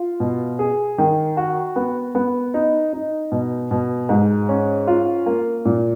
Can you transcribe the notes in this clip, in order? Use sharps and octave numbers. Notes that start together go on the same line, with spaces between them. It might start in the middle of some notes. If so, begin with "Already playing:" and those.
Already playing: F4
B2
G#4
D#3
F#4
B3
B3
D#4
D#4
B2
B2
G#2
C#4
F4
A#3
A#2